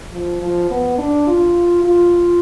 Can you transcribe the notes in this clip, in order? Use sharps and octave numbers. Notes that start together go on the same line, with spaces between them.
F3
F3
B3
D4
F4
F4